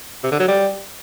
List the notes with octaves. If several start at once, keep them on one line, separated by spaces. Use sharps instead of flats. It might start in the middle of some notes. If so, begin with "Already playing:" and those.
C3
D3
F#3
G3